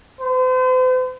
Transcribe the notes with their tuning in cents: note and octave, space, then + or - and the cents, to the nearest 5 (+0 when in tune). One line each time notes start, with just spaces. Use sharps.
C5 -40